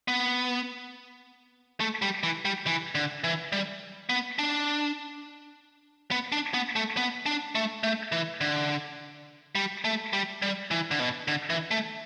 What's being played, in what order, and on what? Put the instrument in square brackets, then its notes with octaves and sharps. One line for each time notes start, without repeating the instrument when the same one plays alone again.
[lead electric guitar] B3
A3
G3
E3
G3
E3
D3
E3
G3
B3
D4
B3
D4
B3
A3
B3
D4
A3
A3
E3
D3
G3
A3
G3
G3
E3
D3
B2
D3
E3
A3